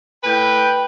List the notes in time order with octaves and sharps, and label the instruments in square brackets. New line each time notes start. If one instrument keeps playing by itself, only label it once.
[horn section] A2 B4 G5